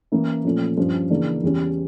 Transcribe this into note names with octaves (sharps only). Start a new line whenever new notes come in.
E3 A#3 C#4 E4
A#2 F3 A3 C#4
G2 F3 C#4
C#3 E3 A#3 D4
E2 E3 G3 C#4